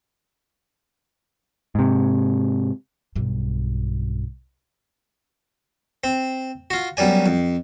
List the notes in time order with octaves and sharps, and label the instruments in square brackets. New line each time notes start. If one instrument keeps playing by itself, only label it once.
[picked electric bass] G#2 C3
[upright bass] B1 G2
[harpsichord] C4
F4 F#4
B1 F#2 G3 D5 G#5
F2